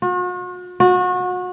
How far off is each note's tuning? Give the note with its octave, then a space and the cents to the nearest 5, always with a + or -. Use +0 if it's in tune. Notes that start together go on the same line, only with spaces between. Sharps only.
F#4 -45
F#4 -30